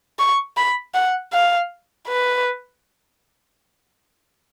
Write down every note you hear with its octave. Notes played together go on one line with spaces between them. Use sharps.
C#6
B5
F#5
F5
B4